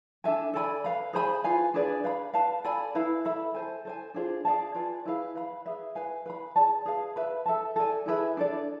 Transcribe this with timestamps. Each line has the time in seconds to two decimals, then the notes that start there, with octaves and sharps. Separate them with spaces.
0.24 D4 A4 E5 G#5
0.53 A4 D5 G#5 B5
0.84 B4 F5 B5
1.13 G#4 C5 G#5 B5
1.44 F4 B4 F5 G#5
1.74 D4 G#4 B4 D5
2.04 B4 F5 B5
2.34 B4 F5 A5
2.64 A4 D5 G#5 B5
2.95 E4 B4 F5 B5
3.25 A4 E5 B5
3.55 A4 C5 G#5
3.85 A4 C5 G#5
4.14 D4 F4 G#4 C5
4.45 G#4 D5 F5 A5
4.75 F4 B4 D5 G#5
5.05 E4 G#4 B4 F5
5.36 B4 F5 B5
5.66 G#4 B4 E5
5.95 B4 F5 G#5
6.26 B4 F5 B5
6.56 G#4 D5 A5
6.85 G#4 B4 F5
7.16 B4 E5 B5
7.46 A4 E5 A5
7.76 A4 D5 G#5
8.06 E4 G#4 B4 E5
8.37 D4 A4 D5